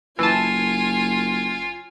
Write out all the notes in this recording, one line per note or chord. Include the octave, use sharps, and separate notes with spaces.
F#1 E3 F4 C#5 G#5 A5